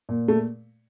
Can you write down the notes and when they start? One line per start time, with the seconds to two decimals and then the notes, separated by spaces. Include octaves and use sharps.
0.09 A#2
0.28 A3